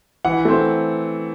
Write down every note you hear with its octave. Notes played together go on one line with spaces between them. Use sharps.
E3 F#5
A3 C4